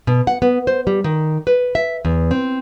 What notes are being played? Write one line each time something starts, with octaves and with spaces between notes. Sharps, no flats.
B2
F#5
B3
C5
G3
D#3
B4
E5
E2
C4